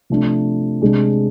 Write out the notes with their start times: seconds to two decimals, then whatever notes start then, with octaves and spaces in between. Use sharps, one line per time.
0.10 C3 F3 A3 D4
0.82 C3 G#3 D4